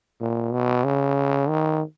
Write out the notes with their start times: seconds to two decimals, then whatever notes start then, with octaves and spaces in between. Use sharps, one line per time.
0.21 A#2
0.53 B2
0.84 C#3
1.49 D#3